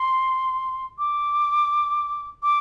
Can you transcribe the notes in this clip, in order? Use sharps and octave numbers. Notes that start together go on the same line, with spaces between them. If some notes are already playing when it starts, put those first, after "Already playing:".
Already playing: C6
D6
D6